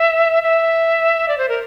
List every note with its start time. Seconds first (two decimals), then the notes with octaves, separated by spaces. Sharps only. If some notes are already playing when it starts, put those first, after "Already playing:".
Already playing: E5
0.43 E5
1.28 D5
1.38 C5
1.49 A#4